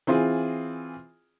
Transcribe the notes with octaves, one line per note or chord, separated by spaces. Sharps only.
E3 C4 F4 G#4